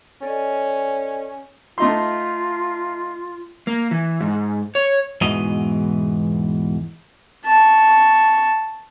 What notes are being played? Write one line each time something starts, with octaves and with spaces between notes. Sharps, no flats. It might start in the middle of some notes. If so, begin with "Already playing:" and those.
C#4 A4 D5 D#5
A3 D#4 F4 C6
A#3
E3
G#2
C#5
E2 G#2 B2 E3 D#5
A5 C#6